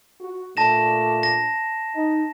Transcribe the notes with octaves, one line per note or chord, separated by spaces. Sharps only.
F#4
A#2 A3 D4 A5 A#6 E7
A#6
D#4